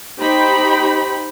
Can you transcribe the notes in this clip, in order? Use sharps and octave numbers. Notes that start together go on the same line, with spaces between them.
D#4 G4 C5 G5 B5